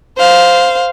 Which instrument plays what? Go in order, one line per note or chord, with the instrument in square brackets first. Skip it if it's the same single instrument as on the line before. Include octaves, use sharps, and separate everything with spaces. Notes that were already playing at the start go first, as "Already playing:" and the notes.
[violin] C5 F5